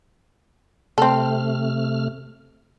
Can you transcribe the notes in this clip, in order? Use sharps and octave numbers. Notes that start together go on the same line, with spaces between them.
C3 A3 C4 A4 F6